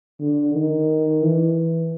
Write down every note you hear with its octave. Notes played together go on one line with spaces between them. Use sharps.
D3
D#3
E3